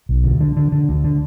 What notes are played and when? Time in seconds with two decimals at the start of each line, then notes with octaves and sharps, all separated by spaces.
0.09 B1
0.24 D2
0.41 D3
0.57 D3
0.72 D3
0.89 D2
1.04 D3